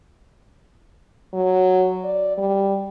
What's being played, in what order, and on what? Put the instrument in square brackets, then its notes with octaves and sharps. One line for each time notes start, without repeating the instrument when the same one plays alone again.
[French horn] F#3
D5
G3